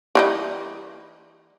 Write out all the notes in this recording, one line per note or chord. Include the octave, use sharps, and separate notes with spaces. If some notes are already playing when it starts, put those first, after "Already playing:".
E3 G3 D#4